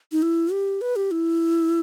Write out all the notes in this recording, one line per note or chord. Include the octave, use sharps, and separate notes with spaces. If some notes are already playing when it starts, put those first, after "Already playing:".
D#4
E4
G4
B4
G4
E4